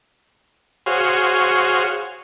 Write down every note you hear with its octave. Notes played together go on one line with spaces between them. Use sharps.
F#4 G#4 C5 C#5 F5